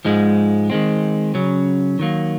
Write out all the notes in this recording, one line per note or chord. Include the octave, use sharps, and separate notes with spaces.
G#2 F3 G#3
D#3 G#3 C4
C#3 F#3 C#4
D#3 F#3 A#3